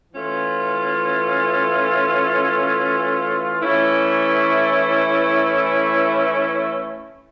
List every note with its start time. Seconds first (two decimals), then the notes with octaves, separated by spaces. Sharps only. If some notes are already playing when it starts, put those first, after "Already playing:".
0.13 E3 A3 C#4 F4
3.60 E3 A3 C#4 E4